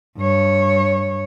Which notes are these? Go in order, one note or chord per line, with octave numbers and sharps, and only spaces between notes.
G2 C#5